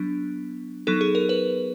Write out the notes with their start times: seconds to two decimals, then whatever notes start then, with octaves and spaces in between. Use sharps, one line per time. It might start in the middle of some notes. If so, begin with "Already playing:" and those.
Already playing: F#3 B3 D4
0.87 F#3 B3 D#4 A4
1.01 G#4
1.15 A#4
1.29 B4